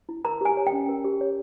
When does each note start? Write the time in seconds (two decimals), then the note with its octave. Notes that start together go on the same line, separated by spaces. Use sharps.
0.09 E4
0.25 A#4 A#5
0.41 G4 G#5
0.57 C#5
0.67 G5
0.72 C#4
0.89 A#4
1.05 G4
1.21 C#5